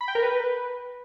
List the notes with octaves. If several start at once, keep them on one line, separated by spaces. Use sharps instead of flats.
B5
G5
A#4
B4